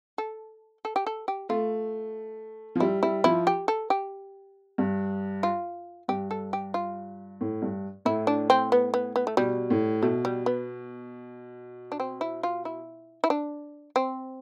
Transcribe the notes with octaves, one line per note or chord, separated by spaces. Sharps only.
A4
A4
G4
A4
G4
A3 F4
F3
G3 E4
G3 E4
F3 E4
G4
A4
G4
G2
F4
G2 G4
A4
G4
F4
A2
G2
A2 E4
D4
C4
B3
B3
B3
A3
B2 G3
A2
B2 A3
G3
B3
D4
C4
E4
F4
E4
E4
D4
C4